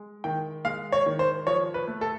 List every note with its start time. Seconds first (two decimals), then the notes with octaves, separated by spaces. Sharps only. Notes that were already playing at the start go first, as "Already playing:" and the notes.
Already playing: G#3
0.24 D#3 G5
0.65 G#3 F5
0.92 C#5
1.06 D#3
1.19 C5
1.47 F3 C#5
1.74 B4
1.87 A3
2.01 A4